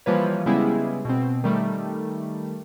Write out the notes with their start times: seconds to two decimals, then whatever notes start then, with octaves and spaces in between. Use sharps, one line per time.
0.06 E3 F3 G3 A#3 B4 C#5
0.46 C#3 G3 G#3 B3 E4 G#4
1.05 B2 C4
1.44 D#3 G3 A3